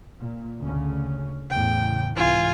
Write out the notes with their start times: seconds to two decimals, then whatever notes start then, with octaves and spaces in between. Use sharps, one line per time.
0.17 A#2
0.63 D2 C#3 C#4
1.50 E2 A2 C#3 G5
2.16 C2 G#2 E3 F4 G#5